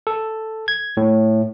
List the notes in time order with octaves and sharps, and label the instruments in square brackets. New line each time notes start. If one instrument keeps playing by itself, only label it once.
[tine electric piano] A4
G#6
A2